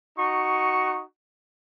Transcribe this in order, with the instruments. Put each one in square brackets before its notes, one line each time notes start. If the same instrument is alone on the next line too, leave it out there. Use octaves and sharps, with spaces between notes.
[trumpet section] D#4 F#4 C#6